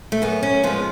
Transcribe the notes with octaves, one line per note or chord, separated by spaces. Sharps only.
A3
F#2 B3
C#4
F3 G#3 B3